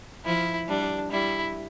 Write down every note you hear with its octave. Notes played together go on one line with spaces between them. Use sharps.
F3 E4
G3 D4
G3 E4